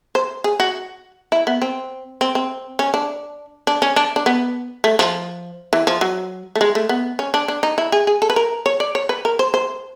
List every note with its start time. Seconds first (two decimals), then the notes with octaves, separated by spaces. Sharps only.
0.15 C5
0.44 G#4
0.60 F#4
1.32 E4
1.47 B3
1.62 C4
2.21 C4
2.35 C4
2.79 C#4
2.94 D4
3.67 D4
3.82 C#4
3.96 D4
4.16 D4
4.26 B3
4.84 A3
4.99 F3
5.73 E3
5.87 F3
6.01 F#3
6.56 A3
6.61 G#3
6.75 A3
6.89 B3
7.19 C#4
7.34 D4
7.48 D4
7.63 D#4
7.78 E4
7.92 G#4
8.07 G#4
8.22 A4
8.30 B4
8.36 A#4
8.66 C#5
8.80 D5
8.95 C#5
9.09 B4
9.25 A#4
9.39 C5
9.54 C5